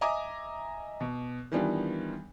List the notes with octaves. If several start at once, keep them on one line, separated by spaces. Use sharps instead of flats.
D#5 E5 G#5 A#5 D6 D#6
B2
D#3 E3 G3 B3 D4 F4